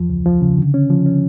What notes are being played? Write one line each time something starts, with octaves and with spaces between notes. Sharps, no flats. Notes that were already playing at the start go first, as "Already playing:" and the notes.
Already playing: E2 F3
C#2
F3
C#3
D3
C#4
F3
C#4